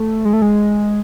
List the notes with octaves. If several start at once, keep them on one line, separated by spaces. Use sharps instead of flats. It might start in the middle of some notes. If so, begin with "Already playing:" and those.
Already playing: A3
G#3
A3
G#3